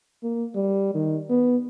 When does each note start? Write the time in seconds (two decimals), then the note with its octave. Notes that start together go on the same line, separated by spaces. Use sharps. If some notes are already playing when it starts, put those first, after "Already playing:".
0.23 A#3
0.56 G3
0.95 D#3
1.30 B3